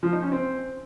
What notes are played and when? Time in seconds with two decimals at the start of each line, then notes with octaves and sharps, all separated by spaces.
0.03 F3
0.12 D#4
0.22 C#4
0.32 C4